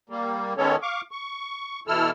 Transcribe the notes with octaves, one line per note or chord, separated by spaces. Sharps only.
G3 A#3
D#3 G#3 B3 C#4 A4 C#5
F5 C#6 D6
C#6
B2 E3 E4 A4 E6 F6